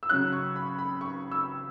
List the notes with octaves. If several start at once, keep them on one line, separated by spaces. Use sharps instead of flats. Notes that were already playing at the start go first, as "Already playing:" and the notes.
E6
C#3 F#3 C#4 F#6
C#6
B5
B5
C#6
E6